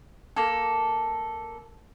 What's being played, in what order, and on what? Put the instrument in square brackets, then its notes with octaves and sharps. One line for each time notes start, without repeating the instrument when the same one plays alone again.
[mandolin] A#3 A4